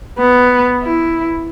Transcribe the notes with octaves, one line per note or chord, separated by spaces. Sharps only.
B3
E4